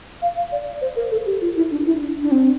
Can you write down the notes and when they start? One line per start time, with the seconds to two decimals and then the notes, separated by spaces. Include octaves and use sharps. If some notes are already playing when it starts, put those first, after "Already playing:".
0.22 F5
0.37 F5
0.52 D5
0.81 C5
0.96 A#4
1.11 A4
1.26 G4
1.41 F4
1.56 E4
1.71 D4
1.86 E4
2.01 D4
2.22 D4
2.31 C4